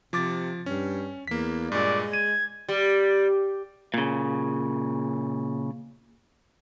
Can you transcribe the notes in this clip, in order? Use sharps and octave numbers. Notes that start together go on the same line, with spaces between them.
C3 F3 D6 A6
G2 C#4
E2 A#3 B6
G2 A#2 G#3 D5
G#6 D#7
G3
A#2 C#3